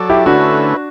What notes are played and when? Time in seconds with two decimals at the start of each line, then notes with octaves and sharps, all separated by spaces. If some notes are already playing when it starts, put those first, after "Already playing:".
Already playing: F#3 A4 D5
0.09 E4 G4
0.26 D3 A3 C#4 D4 E4 F#4 B4